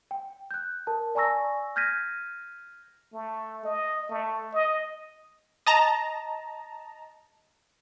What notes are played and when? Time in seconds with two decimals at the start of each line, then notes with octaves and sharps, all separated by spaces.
0.11 G5
0.51 F#6 G6
0.87 A#4 A5
1.15 D5 G#5 A#5 C#6 E6 A#6
1.76 F6 G6 G#6 A#6 B6 D#7
3.13 A3
3.65 D#5
4.09 A3
4.53 D#5
5.66 D#5 A5 A#5